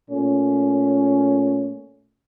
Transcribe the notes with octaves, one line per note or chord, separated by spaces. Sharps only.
A#2 A3 C#4